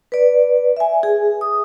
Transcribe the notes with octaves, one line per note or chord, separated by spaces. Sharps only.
B4 D5
E5 G#5
G#4
D#6